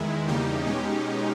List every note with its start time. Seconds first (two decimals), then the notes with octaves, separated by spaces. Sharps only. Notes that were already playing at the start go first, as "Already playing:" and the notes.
Already playing: E2 D#3 G#3 E4
0.27 E2 C#3 G3 A#3 D#4 G4
0.66 B2 G#3 C#4